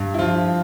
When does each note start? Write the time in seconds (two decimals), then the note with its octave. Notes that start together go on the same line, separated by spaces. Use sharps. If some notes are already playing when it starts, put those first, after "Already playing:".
Already playing: G2
0.14 E4
0.18 F3 F4